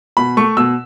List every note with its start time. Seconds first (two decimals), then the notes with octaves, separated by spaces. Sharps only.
0.17 B2 B5
0.37 A3 C#6
0.57 B2 E6